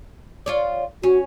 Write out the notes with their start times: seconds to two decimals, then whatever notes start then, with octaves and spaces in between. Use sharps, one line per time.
0.46 F4 C#5 D5
1.03 C#4 F#4